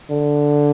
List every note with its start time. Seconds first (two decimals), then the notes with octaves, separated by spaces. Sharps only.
0.11 D3